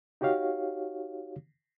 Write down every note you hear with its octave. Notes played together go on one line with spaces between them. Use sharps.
D#4 F#4 G4 C#5 F5